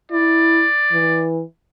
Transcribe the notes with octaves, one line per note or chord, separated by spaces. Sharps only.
E4 D5
E3